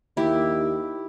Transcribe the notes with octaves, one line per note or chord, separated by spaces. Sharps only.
D#2 E4 G4